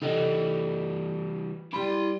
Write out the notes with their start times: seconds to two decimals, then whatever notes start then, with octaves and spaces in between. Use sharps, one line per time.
0.02 E3 G3 D#4 A4 D#5
1.73 G3 E4 B5 C6